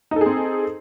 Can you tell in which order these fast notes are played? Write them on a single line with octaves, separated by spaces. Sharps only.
D#4 A4 G#4 C4